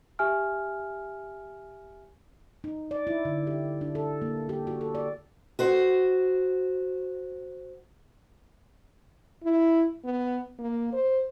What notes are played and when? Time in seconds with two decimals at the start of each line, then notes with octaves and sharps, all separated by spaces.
0.19 G4 E5 G#5 F6
2.64 D#4
2.91 D5
3.07 E4
3.25 D3
3.47 G4
3.81 D4
3.95 A4
4.22 A#3
4.49 G4
4.67 F#4
4.81 A4
4.95 D5
5.59 F#4 C5
9.43 E4
10.04 B3
10.59 A#3
10.93 C5